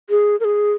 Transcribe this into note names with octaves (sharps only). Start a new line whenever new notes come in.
G#4
A#4
G#4